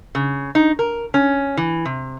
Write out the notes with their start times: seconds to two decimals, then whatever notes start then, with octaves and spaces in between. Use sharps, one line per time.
0.15 C#3
0.55 D#4
0.79 A#4
1.14 C#4
1.57 E3
1.85 C3